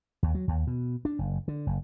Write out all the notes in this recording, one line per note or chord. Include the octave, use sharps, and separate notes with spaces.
D#2
F#3
D#2
B2
D4
F#1
D3
F#1